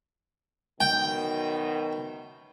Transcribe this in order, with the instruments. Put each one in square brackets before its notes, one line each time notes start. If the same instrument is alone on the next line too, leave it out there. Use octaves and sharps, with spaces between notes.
[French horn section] F#2 B2 D#3 [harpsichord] G5